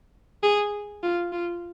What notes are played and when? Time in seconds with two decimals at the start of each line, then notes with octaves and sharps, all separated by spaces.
0.43 G#4
1.03 F4
1.32 F4